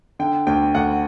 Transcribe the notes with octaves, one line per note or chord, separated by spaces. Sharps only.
D3 G5
D2 G5
D2 F#5